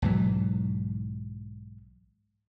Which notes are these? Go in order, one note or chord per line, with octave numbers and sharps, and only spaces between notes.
B1 G#2 E3 F#3